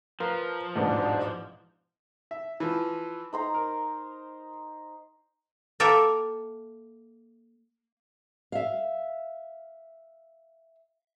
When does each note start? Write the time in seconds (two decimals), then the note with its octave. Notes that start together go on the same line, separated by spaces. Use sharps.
0.20 F3 F4 A#4 B4
0.75 E1 A1 G#2 D4
2.31 E5
2.60 E3 F3
3.33 D#4 C5 A#5
3.54 A#4
5.80 A#3 A4 A#4 E5 G5
8.52 E5 F5